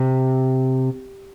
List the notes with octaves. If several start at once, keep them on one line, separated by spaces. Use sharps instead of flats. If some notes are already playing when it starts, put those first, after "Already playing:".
Already playing: C3